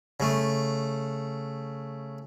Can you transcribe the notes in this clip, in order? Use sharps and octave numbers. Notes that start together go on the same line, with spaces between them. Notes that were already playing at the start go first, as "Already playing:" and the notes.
C#3 A3